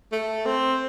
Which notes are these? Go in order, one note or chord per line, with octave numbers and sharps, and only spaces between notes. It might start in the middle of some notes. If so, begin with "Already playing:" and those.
A3
C4